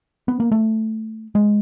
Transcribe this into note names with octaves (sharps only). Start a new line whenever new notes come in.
B3
A#3
A3
G#3